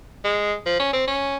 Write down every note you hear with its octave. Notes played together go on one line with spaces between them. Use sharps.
G#3
F3
C#4
C4
C#4